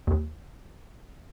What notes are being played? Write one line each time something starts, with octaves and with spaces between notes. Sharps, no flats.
D#2